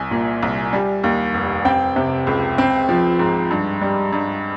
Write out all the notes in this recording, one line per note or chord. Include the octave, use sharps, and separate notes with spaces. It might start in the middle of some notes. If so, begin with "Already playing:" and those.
Already playing: C2 G#5
A#2
C2
G3
D#2
F1
C4 G5
C3
C#2
C4
F3
G#2
G2
G3
G2